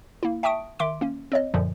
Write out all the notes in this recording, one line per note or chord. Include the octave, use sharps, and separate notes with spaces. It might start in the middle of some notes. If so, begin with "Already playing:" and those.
A#3 E4
E5 G5 A5 C#6 D#6 D7
D#3 E5 C6 D6 D7
A#3 C#4
C4 C#5 D#5
F#2 A#2 D3 F3